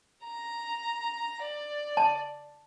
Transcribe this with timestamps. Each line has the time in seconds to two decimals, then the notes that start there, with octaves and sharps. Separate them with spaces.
0.23 A#5
1.42 D5
1.97 A5